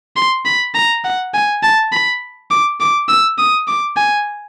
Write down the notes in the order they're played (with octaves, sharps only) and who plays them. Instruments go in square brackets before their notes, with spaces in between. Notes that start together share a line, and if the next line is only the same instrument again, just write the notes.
[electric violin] C6
B5
A#5
F#5
G#5
A5
B5
D6
D6
E6
D#6
D6
G#5